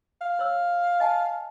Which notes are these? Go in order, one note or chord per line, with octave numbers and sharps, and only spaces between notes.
F5
C5 C#5 E6
D#5 G#5 A5